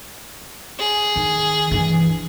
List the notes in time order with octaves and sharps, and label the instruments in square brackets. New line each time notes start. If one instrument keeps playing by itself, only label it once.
[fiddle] G#4
[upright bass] D#3
G2 E3